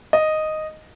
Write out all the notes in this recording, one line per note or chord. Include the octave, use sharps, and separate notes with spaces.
D#5